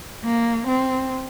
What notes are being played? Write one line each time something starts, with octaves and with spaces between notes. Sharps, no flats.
A#3
C4